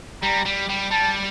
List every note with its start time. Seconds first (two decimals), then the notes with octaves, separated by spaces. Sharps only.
0.22 G3 A#5
0.45 G3
0.69 G3
0.91 G3 A5